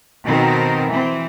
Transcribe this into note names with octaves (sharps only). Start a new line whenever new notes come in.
B2 D#3 C4 A4 A#4
E3 C4